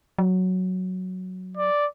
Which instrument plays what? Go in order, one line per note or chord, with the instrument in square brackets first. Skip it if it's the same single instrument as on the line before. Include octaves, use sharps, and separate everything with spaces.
[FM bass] F#3
[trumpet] D5